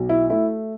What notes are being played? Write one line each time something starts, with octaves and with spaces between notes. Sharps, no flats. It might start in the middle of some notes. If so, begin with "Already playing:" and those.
Already playing: B1
E4
A3 E4